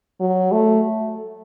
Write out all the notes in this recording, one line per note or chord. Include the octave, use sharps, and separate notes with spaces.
F#3
A3